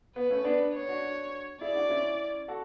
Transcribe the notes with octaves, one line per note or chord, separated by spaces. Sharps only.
B3 B4
A3 C#4
B3 D4
C#5
D4 F#4
E4 G#4 D5
D4 F#4
C#4 E4
F#4 A4